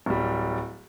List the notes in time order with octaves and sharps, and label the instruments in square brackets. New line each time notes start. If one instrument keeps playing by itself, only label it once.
[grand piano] D1 G3